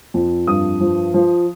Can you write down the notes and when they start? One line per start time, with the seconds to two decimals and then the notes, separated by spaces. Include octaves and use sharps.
0.14 F2
0.47 G2 D#6
0.81 F3
1.14 F3